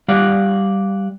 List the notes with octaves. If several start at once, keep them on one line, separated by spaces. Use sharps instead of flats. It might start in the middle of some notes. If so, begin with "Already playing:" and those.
G3 D5 F5 F#5